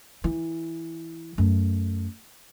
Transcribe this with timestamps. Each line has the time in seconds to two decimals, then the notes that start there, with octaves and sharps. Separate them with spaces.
0.24 E3
1.38 F#2 A3